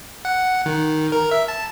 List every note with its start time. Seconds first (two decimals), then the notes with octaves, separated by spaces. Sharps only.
0.25 F#5
0.66 D#3
1.12 A#4
1.31 E5
1.48 A5